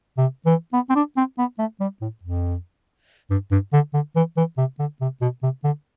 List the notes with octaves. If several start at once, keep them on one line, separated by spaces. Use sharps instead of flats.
C3
E3
B3
C4
D4
C4
B3
A3
G3
A2
F2
G2
G2
D3
D3
E3
E3
C3
D3
C3
B2
C3
D3